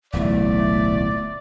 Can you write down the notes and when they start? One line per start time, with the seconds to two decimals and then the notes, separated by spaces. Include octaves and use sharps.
0.13 D1 B1 E3 A3 D5